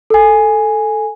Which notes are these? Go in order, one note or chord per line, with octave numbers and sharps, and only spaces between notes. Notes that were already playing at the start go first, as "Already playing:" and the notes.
A4 G#5